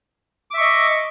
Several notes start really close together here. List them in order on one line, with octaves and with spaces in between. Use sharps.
D6 E5 C#6 D#5